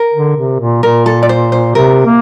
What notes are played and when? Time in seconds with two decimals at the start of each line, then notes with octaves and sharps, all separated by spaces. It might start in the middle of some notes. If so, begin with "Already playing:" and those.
Already playing: A#4
0.14 D3
0.37 C3
0.60 A#2
0.83 A#2 A#4
1.06 A4
1.23 D5
1.29 C5
1.52 C5
1.75 C3 A#4
2.06 A#3